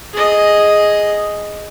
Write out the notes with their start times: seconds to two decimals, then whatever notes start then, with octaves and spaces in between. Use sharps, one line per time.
0.13 G#4 D#5